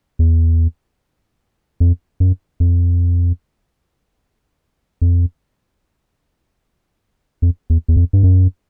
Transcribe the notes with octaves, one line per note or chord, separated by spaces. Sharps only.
E2
F2
F#2
F2
F2
F2
E2
E2
F2
G2
F#2